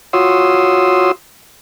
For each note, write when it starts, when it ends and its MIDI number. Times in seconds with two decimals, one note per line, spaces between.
0.13 1.11 65
0.13 1.11 66
0.13 1.11 73
0.13 1.11 84
0.13 1.11 87
0.13 1.11 88